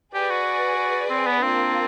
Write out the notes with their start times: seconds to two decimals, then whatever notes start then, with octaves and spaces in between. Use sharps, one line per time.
0.14 G4 G#4 B4 D5
0.30 F#4
1.10 C4
1.27 B3
1.43 A#3 C4 D4 F4